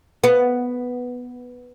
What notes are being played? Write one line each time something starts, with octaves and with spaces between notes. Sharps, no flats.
B3